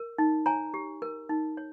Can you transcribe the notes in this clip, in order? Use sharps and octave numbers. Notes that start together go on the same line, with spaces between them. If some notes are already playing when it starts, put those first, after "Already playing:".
Already playing: A#4
D#4
C#5 G#5 A#5
G4
A#4
D#4
C#5